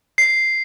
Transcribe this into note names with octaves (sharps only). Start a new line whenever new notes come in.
C7